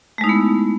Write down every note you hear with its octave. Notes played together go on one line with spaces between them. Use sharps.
G#3 A3 B3 D#4 E4